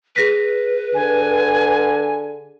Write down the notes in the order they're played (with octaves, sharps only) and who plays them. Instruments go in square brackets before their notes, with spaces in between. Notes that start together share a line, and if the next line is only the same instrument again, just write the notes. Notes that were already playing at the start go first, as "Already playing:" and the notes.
[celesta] G#4 A#6 B6 [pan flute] B4
[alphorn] D3 [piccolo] G#5